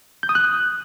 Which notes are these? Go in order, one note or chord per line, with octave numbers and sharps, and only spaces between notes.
G6
D#6
F#6